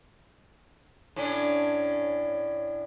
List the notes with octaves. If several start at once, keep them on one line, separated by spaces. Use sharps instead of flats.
A2 C#4 D4